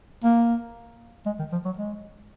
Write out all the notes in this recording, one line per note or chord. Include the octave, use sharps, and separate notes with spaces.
A#3
G#3
D#3
F3
F#3
G#3